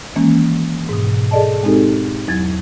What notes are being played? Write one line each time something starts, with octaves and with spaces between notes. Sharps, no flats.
D#3 E3 G#3 A#3 C#4
G#2 B2
G#4 A4 D5 D#5 A5
G#3 C4 D#4 G4 A4
E2 F#3 G#6 A6